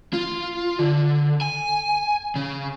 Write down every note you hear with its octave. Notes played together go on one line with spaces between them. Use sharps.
F4
D3
G#5
C#3